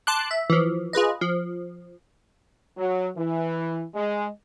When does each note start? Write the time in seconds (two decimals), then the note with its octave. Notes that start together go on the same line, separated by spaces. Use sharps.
0.07 A5 C6 D6 F#6
0.31 E5
0.50 E3 F3
0.93 F4 G#4 B4 D#5
1.21 F3
2.77 F#3
3.16 E3
3.94 G#3